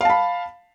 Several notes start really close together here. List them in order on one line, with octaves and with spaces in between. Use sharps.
F5 A5 B5